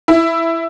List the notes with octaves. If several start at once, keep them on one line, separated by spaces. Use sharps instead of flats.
E4